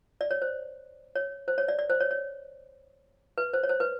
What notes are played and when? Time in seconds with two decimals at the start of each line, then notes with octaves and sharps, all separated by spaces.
0.21 D5
0.31 C#5
0.42 C5
1.16 C#5
1.48 C5
1.58 C#5
1.68 D5
1.79 D5
1.90 C5
2.01 C#5
2.11 C#5
3.38 B4
3.54 C5
3.63 C#5
3.69 C5
3.80 B4